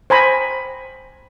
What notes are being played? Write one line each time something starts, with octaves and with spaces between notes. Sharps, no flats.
C5 G#5 A#5 B5